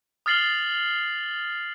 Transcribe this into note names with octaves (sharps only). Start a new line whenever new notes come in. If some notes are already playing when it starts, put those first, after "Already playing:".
D#6 F6 A6 C7 F#7 G7